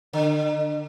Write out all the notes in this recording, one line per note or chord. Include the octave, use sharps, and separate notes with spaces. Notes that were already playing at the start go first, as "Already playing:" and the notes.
D3